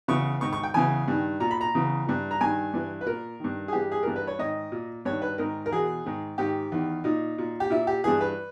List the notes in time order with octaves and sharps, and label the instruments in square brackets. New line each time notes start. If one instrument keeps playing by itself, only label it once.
[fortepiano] E2 C#3 E3 C#6
G#2 D#3 C#6
C#6
G5
E2 C#3 E3 G#5
G2 D#3
A#2 A#5
B5
A#5
E2 C#3 E3
G2 E3
A#5
G2 D#3 G#5
G2 E3
B4
A#2 A#4
G2 D#3
G#4
G2 E3 G4
G#4
G2 E3 A#4
B4
C#5
G#2 D#3 D#5
A#2
G2 D#3 C#5
B4
G#2 D#3 A#4
A#4
E2 B2 G#4
G#2 D#3
G#2 D#3 G4
E2 D#3
A#2 D#4
A#2
G4
A#2 E4
G4
G2 E3 G#4
B4